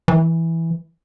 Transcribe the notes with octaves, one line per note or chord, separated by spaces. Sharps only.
E3